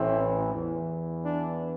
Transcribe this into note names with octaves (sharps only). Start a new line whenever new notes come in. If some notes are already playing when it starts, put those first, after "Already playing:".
Already playing: A1 A2 E3 C4
E2 E3
D4